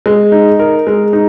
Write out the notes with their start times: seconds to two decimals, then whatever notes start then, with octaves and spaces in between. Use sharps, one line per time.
0.06 G#3
0.32 D#4
0.60 A#4
0.87 G#3
1.13 D#4